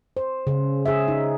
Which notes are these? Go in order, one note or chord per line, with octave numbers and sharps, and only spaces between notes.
C5
C#3
G#4 E5
D#4